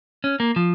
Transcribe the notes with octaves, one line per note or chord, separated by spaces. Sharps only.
C#4
A#3
F3